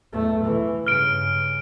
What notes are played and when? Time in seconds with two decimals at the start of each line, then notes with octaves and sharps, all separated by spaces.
0.13 E2 A3
0.45 E3
0.87 G2 C#3 F6 D7